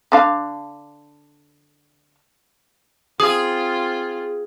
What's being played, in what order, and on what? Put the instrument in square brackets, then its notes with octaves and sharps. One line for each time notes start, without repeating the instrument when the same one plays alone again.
[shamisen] D3 D4 F5
[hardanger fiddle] C4 F4 [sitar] G#4 [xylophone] D#6